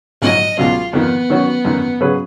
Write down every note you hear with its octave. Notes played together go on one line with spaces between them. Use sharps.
A#1 G#2 F#3 D#5
C#2 B2 F#3 F4
F2 D#3 A#3 B3
D#3 F#3 C#4 F#4
F#2 D#3 A#3
C#3 F#3 C#4 G#4 B4